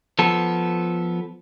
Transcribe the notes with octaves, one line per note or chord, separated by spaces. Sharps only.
F3 B3 A4